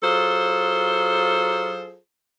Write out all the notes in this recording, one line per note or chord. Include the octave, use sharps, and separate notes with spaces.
F#3 F4 G#4 A4 C5